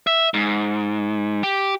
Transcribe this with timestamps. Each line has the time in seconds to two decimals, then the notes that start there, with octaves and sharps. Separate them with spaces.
0.07 E5
0.34 G#2
1.43 G4